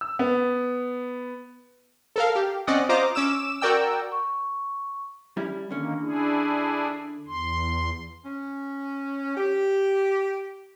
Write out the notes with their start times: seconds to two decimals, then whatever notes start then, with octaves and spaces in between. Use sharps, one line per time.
0.01 E6
0.19 B3
2.16 A4 A#4 F5
2.35 G4
2.67 C4 C#4 D5 D#5 F#5
2.89 F4 C5 D#5 A#5 D6
3.15 C#4 D6 E6 E7
3.61 F#4 A#4 D5 G5 E6
4.12 C#6
5.37 G3 C#4 E4
5.71 D3 D#3 A#3 C#4
6.01 D4 E4 G#4
7.27 E2 C6
8.24 C#4
9.37 G4